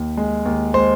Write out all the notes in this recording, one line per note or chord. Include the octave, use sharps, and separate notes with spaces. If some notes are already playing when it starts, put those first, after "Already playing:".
Already playing: D#2
G#3
D#2
G#3 C5